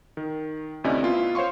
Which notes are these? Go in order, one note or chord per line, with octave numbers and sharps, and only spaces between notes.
D#3
D2 C3 C#4 E4 D5 D#5
B3 C#4 E4 F4
C5 C#5 F5 C6 C#6